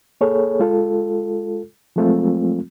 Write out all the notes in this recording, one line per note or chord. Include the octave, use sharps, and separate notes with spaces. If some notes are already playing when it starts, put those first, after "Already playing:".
A#3 G#4 A4 C#5
G#3 F4 A4
F3 F#3 G#3 A3 C4 F4